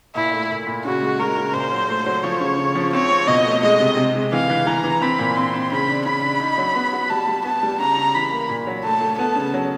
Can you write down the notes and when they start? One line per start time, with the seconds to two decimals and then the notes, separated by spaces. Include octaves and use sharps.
0.15 A#2 E4
0.33 A3
0.50 A#2
0.67 A#2
0.84 C#3 F#4
1.01 G#3
1.19 G#3 A#4
1.37 C#3
1.54 A#2 C5
1.72 F#3
1.88 A3
2.06 F#3
2.23 F3 C#5
2.41 C#3
2.59 C#3
2.75 F3
2.93 C4 C#5
3.11 C4
3.27 B2 D#5
3.45 A3
3.63 G#3 D#5
3.80 C3
3.97 C3
4.15 G#3
4.32 E3 F5
4.50 E3
4.66 E3 A#5
4.84 E3
5.02 C4 B5
5.19 A#2
5.36 C4 C6
5.54 C4
5.72 C#3 B5
5.89 D4
6.06 C#3 B5
6.24 D4
6.40 D#4
6.58 F#3
6.75 B3
6.93 F#4
7.10 G3 A5
7.28 G3
7.45 B3 A5
7.63 G3
7.79 C#3 A#5
7.97 C#3
8.14 E3 B5
8.32 A#3
8.49 A#2
8.67 F#3
8.84 A3 A5
9.01 A3
9.18 B3 A5
9.36 C#3
9.54 F#3